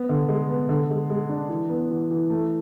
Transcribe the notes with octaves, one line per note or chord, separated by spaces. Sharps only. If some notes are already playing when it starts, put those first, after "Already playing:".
Already playing: B3
D3
G#3
B3
D3
G#3
G#3
D4
E3
B3
E3
E3
A3